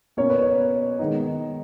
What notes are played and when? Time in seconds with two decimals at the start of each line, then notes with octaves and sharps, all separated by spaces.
0.17 B2 A#3 C#4 C#5
0.29 B4
0.42 C#5
0.99 D#3 G#3 B3 D#4